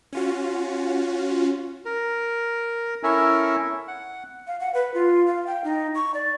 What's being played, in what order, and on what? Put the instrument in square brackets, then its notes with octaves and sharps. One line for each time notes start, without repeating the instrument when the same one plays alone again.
[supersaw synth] C#4 F4 F#4
[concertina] A#4
C#4 E4 A4 A#4 E5 G#5
F#5
[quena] F5
F#5
B4
F4
F5
G5
D#4
C#6
D5